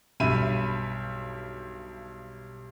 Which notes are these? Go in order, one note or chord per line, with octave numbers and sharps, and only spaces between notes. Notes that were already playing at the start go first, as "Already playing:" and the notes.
B1 G2 E5 B5 D#7